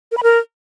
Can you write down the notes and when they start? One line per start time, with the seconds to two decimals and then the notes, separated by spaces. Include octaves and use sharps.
0.12 A#4
0.17 B5
0.23 A#4